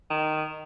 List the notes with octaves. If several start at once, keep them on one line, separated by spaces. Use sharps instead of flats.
D#3